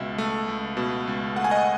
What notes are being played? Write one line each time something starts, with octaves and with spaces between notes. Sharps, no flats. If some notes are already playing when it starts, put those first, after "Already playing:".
Already playing: C#2 B2 E5
A3
C#2
B2
C#2
A3 F#5
G#5
D#5 F#5